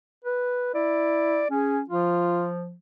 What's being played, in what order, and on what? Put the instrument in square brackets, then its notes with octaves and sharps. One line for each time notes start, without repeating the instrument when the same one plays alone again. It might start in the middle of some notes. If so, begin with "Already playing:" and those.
[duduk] B4
[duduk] E4 [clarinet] D5
[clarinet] C#4 [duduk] G#4
[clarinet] F3 [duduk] F4